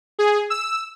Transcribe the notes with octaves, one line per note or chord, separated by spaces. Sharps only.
G#4
E6